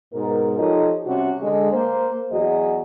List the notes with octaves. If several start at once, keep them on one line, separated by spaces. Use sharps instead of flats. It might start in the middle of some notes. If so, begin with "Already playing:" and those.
G#2 B2 A#4
F3 D#4 G4 A4 C#5 D#5
C3 G3 C#4 F#4
D3 G#3
A#3 C5
E2 F#3 F#4 G#4 D#5